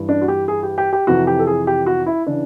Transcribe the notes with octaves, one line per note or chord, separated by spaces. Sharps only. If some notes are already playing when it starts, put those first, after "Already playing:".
Already playing: G2 E3
D4
F#4
G4
G#4
G4
G4
G4
F2 C3 E3 F#4
G4
A4
G#4
G4
F#4
E4
C#3 E3 D4